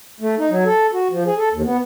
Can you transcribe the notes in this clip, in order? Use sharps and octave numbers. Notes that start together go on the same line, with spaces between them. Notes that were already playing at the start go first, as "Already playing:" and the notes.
A3
D#4
F#3
A4
F#4
F3
G#4
A4
D#2
B3